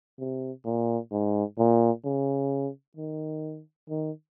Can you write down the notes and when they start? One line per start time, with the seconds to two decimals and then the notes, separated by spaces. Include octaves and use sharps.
0.19 C3
0.66 A#2
1.12 G#2
1.59 A#2
2.04 C#3
2.97 D#3
3.89 D#3